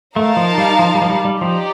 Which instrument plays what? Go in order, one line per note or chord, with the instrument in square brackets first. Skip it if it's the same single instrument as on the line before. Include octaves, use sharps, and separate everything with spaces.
[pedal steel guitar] A3 [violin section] D#4 A#4 F5 A5
[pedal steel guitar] F3
G3
F3
G3
F3
G3
G3
[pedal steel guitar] F3 [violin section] D#4 G4 D5